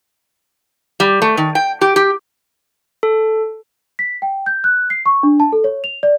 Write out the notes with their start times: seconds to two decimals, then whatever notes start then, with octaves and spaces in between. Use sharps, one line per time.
1.00 G3
1.22 A3
1.37 D#3
1.55 G5
1.81 G4
1.96 G4
3.03 A4
3.99 B6
4.22 G5
4.46 G6
4.64 F#6
4.90 C7
5.06 C#6
5.23 D4
5.40 A5
5.52 A4
5.64 C#5
5.84 F7
6.03 D5